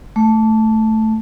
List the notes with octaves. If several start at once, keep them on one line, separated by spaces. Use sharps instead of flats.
A3